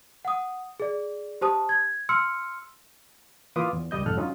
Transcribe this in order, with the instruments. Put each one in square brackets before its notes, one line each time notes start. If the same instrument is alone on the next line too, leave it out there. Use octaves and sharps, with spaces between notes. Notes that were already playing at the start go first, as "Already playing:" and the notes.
[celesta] F#5 D#6
G#4 D5
G4 C5 A5 D#6
G#6
C6 E6 F6 C#7
[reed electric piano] E3 A#3 F4 B4 D6 D#6
E2
C#2 G3 D#5 G6
C2 F2 G#2 A4 F6 F#6
F#3 C#4 D#4 F4